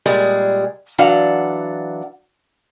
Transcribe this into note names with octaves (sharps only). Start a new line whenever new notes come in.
A#2 G3 G#3 G#4
E3 F#3 D4 F5 F#5